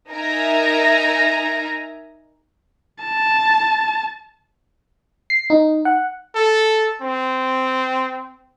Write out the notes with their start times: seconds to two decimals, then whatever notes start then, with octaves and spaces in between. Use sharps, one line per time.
0.11 D#4 A#4 E5 G#5 A#5
3.04 A5
5.30 C7
5.50 D#4
5.85 F#5
6.35 A4
7.01 C4